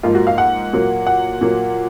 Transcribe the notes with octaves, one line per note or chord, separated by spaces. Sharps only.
G#2 F3 A#3 F4
F#4
F5
F#5
A#2 F#3 A#3
F#5
A#2 F#3 A#3